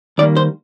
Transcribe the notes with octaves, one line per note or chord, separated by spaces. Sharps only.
D#2 D#3 G3 A#3 D5
C5